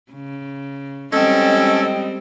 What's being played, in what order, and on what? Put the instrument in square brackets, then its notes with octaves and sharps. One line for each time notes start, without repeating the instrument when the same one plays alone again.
[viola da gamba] C#3
[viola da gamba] G3 G#3 C4 [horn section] C#4 A4 [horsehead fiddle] D#5 G5